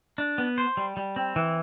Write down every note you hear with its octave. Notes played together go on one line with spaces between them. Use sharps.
D4
B3
C5
G3
G3
C4
E3